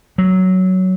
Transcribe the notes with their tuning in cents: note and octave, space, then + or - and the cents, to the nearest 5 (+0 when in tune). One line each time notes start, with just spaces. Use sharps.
F#3 +10